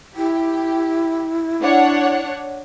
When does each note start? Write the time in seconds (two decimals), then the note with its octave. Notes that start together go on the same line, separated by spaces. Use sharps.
0.16 E4 G4
1.61 D4 C#5 F#5